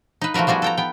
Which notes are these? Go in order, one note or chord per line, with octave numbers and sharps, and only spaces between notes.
D#4 B4
F3 A3 F#4 A#4 B4
F3 G3 B3 F#4 G#4
A4 G5 A#5
B3 G5